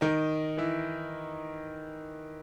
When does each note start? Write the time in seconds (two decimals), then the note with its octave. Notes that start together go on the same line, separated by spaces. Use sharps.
0.01 D#3 D#4
0.57 E3 E4